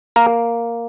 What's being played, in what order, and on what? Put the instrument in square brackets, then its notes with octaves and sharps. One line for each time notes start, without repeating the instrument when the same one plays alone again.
[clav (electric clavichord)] A#3 A#4